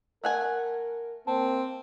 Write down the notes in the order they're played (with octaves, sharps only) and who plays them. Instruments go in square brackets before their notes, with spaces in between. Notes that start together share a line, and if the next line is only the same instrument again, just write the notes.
[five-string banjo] A3 F#5 G#5 [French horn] A#4
[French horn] A#3 [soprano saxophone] C4 [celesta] A5